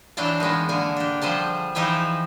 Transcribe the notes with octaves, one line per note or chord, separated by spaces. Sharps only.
E3 F#3 D4 F5 G5 A5
D#3 E3 G#3 B3
D3 A#3 G#5
D4 G4
F3 G3 G#4 C5 A5
E3 F3 D#4 G4 G#4 E5